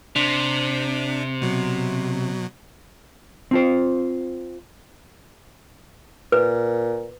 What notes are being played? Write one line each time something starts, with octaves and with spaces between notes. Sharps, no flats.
C3 D4
B2 F#3
C4 F4 C5
A#2 B4